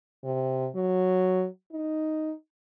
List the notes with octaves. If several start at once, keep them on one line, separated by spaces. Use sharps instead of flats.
C3
F#3
D#4